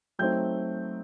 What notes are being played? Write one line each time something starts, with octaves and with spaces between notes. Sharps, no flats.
F#3 A3 C4 D#4 G5 G6